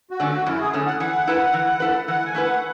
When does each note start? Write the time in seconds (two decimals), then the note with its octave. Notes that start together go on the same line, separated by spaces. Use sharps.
0.11 F#4
0.20 D3 A3 C#4
0.28 F#4
0.46 F#2 E4
0.60 G#4
0.73 D3 A3 C#4
0.86 F#5
1.00 E3 F#5
1.27 A3 E4 B4
1.54 E3
1.80 A3 E4 B4
2.07 E3 F#5
2.25 G#5
2.35 A3 E4 B4
2.43 F#5